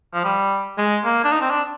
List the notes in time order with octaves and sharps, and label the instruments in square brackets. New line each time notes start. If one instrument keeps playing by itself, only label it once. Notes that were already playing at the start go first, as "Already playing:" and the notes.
[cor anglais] F3
G3
G#3
A#3
D4
D#4
C4
D4